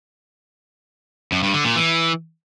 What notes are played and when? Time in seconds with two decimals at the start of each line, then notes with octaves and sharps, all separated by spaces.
1.32 F#2
1.43 G2
1.54 D3
1.65 A#2
1.75 E3